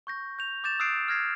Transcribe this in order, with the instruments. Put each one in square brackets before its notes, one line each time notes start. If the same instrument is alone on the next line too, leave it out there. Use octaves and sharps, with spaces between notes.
[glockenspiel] C#6 G6 A#6
G6 F7
D6 G6 A6 E7
D#6 E6 F#6 A6 C7 D7
F6 G#6 A#6 C7